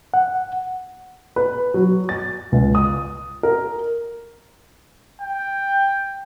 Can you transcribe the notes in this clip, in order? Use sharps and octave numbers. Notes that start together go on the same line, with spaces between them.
F#5
B4
F#3
A6
C#2
D#6
A#4
G5